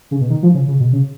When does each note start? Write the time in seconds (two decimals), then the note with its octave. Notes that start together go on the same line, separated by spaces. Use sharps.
0.11 C#3
0.20 B2
0.30 D#3
0.43 F3
0.54 C#3
0.68 C#3
0.80 B2
0.92 C#3